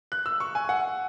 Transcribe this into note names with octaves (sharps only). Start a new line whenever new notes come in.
F#6
E6
C#6
G#5
F#5